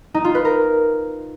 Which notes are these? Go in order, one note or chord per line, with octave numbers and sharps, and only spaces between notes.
D#4
F4
B4
A#4